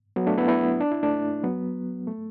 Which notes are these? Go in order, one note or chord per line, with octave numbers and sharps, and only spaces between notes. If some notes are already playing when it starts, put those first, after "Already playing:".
F#3 B3
A3 D4
B3 E4
B3 E4
D4
E4
A3 D4
F#3 B3
A3